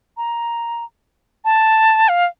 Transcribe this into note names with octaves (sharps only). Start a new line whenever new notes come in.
A#5
A5
F5